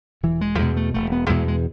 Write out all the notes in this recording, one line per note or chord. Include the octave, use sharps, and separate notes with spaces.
E1 E3
G#3
E2 B2 G#3
A3
E1 A3
B3
E2 B2 G#3
G#3